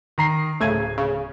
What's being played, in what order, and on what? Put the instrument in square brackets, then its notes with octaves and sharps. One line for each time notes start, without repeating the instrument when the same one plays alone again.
[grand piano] D#3 A#5 C7
[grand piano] D1 G#6 D#7 [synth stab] C#3 A3
[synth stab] C#3